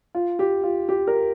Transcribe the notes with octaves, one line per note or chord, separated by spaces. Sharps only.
F4
G4
F4
G4
A#4